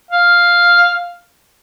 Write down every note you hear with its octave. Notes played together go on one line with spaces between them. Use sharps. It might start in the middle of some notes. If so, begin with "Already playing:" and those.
F5